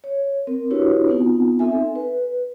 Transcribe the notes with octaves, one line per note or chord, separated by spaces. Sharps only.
C#5
C4 A#4
D4 E4 F#4 G4 B4 C#5
B3 C4 D#4 F4
C4 D#4 A4 E5 G#5
B4